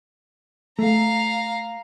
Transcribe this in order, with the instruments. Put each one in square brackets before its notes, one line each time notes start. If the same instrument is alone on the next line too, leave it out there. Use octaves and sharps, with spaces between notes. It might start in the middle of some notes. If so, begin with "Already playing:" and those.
[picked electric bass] A3 [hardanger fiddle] F5 A#5